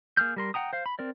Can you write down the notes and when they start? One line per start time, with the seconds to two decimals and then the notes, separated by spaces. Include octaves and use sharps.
0.17 A#3 G#4 F6 G6
0.36 G3 A#4 C6
0.54 F#5 G5 A#5 D#6
0.73 C5 F5
0.86 B5
0.99 C4 A#4 D5